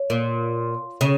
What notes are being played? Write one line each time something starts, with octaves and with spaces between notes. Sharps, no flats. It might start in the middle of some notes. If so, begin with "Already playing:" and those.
Already playing: C#5
A#2
C#3